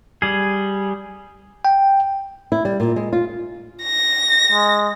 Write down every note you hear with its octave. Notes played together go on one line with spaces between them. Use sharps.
G3 G#4
G5
E4
G3
A#2
G#3
F4
A#6
G#3